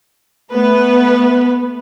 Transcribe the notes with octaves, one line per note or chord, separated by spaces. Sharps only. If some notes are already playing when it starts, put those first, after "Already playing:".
A3 B3 B4